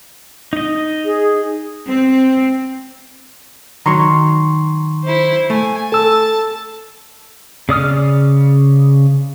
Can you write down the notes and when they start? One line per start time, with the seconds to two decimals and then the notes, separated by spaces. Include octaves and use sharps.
0.53 D#4 D#5
1.05 G#4
1.90 C4
3.86 D#3 F#3 A#5 C6 C#6
5.04 E4 C5
5.50 A3 G#5
5.92 A4 A5 E6
7.69 C#3 D5 D#6 F6